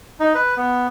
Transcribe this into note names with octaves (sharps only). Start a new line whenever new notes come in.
D#4
B4
B3